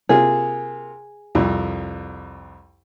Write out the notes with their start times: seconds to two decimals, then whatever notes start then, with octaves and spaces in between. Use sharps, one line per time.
0.09 C3 A#3 F4 G#4
1.35 C2 F2